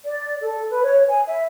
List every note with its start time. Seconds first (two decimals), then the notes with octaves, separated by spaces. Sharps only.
0.04 D5
0.42 A4
0.70 B4
0.84 C#5
1.08 G#5
1.27 E5